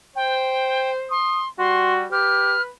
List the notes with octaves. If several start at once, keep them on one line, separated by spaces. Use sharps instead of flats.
C5 G5
C6 D#6
G3 F#4 C6
G4 B4 F6